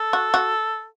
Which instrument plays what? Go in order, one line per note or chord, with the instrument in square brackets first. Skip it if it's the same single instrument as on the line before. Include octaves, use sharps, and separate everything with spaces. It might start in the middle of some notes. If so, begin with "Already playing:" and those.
Already playing: [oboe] A4
[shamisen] F#4
F#4